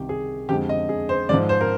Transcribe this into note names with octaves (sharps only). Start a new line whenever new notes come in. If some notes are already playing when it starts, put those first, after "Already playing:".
Already playing: C2 C3 D#3 G4
G#4
F2 D3 G#3 G4
D#5
G#4
C5
G#2 F3 G#3 D5
C5
A#4